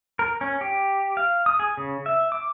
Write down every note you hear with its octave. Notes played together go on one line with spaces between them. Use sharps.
A#4
C#4
G4
F5
D#6
G#4
C#3
E5
D6